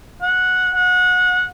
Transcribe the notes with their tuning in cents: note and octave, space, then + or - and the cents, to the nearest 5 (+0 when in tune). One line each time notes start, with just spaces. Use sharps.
F#5 -10
F#5 -25